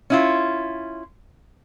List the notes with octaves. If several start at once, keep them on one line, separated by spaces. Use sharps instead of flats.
C#4 E4 F4